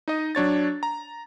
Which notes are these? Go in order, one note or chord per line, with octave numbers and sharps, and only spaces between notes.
D#4 D#5
F#3 D4 C#5 A6
A#5